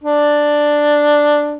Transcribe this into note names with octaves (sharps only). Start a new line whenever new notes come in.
D4